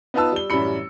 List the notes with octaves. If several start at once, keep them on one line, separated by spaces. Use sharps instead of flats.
B3 D#4 F4 B4 A5 E6
G3 G7
A1 F#2 G3 E4 B5 C#7